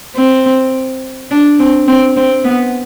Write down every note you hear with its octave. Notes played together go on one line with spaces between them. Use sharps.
C4
D4
C4
C4
C4
B3